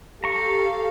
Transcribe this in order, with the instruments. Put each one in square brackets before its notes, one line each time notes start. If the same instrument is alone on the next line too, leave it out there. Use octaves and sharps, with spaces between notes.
[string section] G4 A4 F5 [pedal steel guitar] A#5 C#6